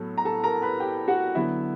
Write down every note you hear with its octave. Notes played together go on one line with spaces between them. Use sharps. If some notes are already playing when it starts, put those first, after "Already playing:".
Already playing: A2 F#3 B3 A4
A#5
A4 A5
A#4 A#5
B4 B5
G4 G5
F#4 F#5
D3 F#3 B3 E4 E5